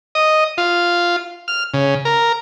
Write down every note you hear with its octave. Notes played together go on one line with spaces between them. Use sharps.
D#5
F4
F6
C#3
A#4